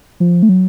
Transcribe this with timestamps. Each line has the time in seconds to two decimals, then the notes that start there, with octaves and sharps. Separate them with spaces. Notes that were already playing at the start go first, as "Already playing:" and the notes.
0.20 F3
0.43 A3
0.49 F#3